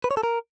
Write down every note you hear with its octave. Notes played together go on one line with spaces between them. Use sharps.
B4
C#5
A4
A#4